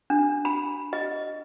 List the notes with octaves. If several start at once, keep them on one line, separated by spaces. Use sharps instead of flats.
D4
B5
D#5